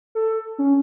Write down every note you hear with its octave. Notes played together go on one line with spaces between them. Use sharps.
A4
C#4